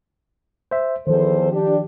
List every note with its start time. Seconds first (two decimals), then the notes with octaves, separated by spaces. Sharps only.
0.71 C5 E5
1.07 E2 D#3 F3 A4 C5
1.51 D4 G4